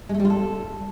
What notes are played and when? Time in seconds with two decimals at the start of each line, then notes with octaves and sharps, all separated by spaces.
0.09 G#3
0.14 A3
0.20 G3
0.25 F4
0.30 A4